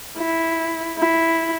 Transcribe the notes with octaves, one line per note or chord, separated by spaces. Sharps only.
E4
E4